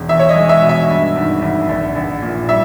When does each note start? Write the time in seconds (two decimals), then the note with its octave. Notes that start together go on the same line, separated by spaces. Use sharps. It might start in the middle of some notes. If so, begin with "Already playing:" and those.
Already playing: E1
0.09 E2 E5
0.19 C#5
0.29 D#5
0.35 G#3
0.49 E5
0.63 B2
0.69 E5
0.89 G2
1.16 G#1
1.42 G#1
1.69 A#1
1.96 A#1
2.22 A#2
2.49 G3 E5